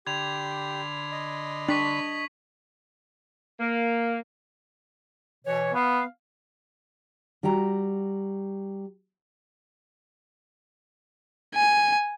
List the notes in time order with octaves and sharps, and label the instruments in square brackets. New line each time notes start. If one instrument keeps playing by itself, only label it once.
[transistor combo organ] D3 B5 C6 [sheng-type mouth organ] G4 [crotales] G#6 F7
[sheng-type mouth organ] D#5
[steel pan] D4 [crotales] C#6 B6 F#7
[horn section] A#3
[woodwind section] B2 E3 C#5
[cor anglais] B3 [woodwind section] F5
[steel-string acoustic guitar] G3 F#4 G5 A#5
[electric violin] G#5